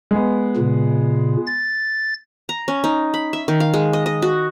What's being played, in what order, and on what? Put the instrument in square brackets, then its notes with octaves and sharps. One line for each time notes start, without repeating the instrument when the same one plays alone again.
[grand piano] G#3 B3
[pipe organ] A#2 C#3
A6
[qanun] A#5
C#4
D#4
B5
E5
D#3
F5
G#3
D#5
D#5
F#4